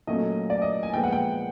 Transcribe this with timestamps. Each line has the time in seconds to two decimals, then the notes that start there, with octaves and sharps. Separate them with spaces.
0.07 A#2 F#3 A3 C#4 D#5
0.50 D5
0.62 D#5
0.83 G#5
0.94 A#2 F3 G#3 B3 G5
1.04 F#5
1.13 G5